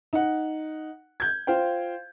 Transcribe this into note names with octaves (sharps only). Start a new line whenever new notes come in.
D#4 F#5
G6 G#6
F4 C5 F5 G5